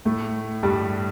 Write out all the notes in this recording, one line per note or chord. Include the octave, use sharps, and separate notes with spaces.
A2 A3
G2 G3